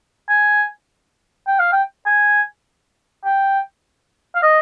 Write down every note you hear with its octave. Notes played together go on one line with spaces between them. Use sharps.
G#5
G5
F5
G5
G#5
G5
F5
D#5